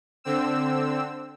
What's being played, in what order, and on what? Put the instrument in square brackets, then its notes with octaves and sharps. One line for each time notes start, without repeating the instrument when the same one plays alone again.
[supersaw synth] D3 C4 E6